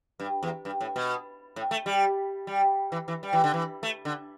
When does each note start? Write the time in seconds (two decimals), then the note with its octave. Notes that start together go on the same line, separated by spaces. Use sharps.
0.20 G2
0.43 E2
0.65 G2
0.81 A2
0.96 B2
1.56 A2
1.71 A3
1.86 G3
2.47 G3
2.92 E3
3.08 E3
3.23 G3
3.33 E3
3.44 D3
3.54 E3
3.83 A3
4.05 D3